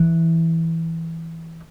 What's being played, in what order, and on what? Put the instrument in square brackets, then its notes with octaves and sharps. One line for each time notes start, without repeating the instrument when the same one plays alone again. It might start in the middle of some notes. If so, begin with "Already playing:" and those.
Already playing: [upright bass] E3